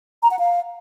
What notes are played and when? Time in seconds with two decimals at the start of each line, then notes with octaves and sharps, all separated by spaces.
0.23 A#5
0.31 F#5
0.39 F5